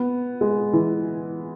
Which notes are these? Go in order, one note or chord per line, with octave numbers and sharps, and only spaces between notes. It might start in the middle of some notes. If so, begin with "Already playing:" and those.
Already playing: B3
G#3
E3